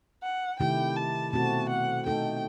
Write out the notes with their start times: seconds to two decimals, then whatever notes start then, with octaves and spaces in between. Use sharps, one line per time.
0.23 F#5
0.60 C3 D#3 A3 E4 G4 G5
0.96 A5
1.33 B2 A3 C4 F#4 A5
1.70 F#5
2.06 A3 D#4 A4 G5